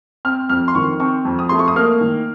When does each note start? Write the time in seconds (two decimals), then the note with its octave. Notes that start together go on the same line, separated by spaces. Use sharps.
0.25 C4 F6
0.49 F2 F6
0.68 C6
0.75 D#3 C#6
1.00 C4 C#6
1.25 F2
1.39 D#6
1.49 A3 C6
1.59 C#6
1.68 D#6
1.76 A#3 F6
2.01 D#3